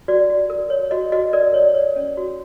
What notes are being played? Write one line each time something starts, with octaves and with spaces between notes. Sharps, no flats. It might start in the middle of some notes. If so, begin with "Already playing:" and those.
F#4 D5
F#4
A#4
C#5
F#4 D#5
F#4 D#5
A#4 D5
C#5 D5
C#5
C#4
F#4